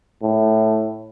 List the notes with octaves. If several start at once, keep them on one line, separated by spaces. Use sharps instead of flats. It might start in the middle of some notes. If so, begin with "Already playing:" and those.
A2